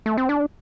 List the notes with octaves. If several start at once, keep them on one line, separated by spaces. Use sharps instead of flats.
A3
C4
D4